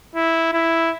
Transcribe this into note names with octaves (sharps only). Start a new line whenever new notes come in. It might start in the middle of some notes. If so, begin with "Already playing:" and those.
E4
E4